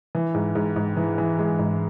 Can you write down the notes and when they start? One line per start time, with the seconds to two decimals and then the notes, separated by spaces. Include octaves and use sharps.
0.15 E3
0.34 G#2
0.55 G#2
0.76 G#2
0.97 E3
1.18 E3
1.39 G#3
1.59 G#2